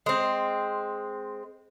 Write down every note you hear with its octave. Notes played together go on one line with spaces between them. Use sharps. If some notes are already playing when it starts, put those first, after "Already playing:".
G#3 C4